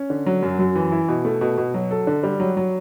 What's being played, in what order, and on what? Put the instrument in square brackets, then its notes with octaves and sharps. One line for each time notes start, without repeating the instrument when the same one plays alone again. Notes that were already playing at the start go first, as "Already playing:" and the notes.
Already playing: [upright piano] C#4
D3
F#3
F#2
F#2
E3
E4
B2
A3
B2
B2
F#3
A4
D3
G3
F#3
F#3